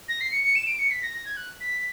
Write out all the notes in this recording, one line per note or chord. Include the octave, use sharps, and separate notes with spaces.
A#6
C7
C#7
C#7
E7
D7
C#7
B6
A#6
A#6
G#6
F#6
B6